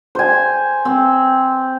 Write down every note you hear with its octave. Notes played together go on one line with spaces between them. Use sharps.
C5 G#5
C4